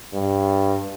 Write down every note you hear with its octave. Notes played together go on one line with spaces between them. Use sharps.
G2